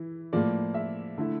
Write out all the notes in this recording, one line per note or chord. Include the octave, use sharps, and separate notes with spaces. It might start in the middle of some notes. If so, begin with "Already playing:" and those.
Already playing: E3 E4
A2 F3 A#3 D5
E5
D3 A3 E4